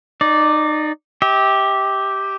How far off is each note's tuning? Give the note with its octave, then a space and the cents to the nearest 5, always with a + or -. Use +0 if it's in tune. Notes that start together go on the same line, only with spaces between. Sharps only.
D#4 -25 D5 +0
G4 +0 E5 -35